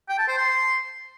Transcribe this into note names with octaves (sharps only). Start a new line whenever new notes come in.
G5
A5
C5
C6